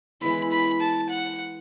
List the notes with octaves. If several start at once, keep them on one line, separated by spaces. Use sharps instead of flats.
E3 G#3 B3 E4 B5
B5
A5
F#5